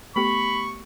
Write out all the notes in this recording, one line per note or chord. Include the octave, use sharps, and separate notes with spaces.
A3 B3 G4 B5 C#6